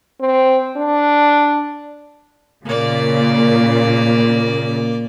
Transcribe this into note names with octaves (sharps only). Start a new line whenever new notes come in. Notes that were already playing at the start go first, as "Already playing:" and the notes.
C4
D4
A#2 C#3 A#3 D5